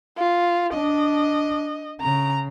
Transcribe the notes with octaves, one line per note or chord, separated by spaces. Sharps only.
F4
D4 D#5
C#3 A#5